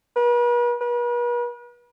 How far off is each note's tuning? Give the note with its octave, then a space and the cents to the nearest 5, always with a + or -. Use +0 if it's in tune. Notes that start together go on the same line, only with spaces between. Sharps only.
B4 -45
B4 -45